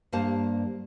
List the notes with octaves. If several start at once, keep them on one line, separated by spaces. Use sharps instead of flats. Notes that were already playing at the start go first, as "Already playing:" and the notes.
G2 G3 A#3 C5 F5 A5